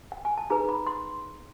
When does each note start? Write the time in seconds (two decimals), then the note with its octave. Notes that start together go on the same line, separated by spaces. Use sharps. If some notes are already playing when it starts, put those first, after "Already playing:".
0.12 G5
0.25 G#5
0.38 A5
0.50 D#4 G#4 B4 A#5
0.69 B5
0.87 C6